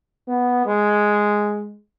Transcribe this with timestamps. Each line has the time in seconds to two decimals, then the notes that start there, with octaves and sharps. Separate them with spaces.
0.28 B3
0.66 G#3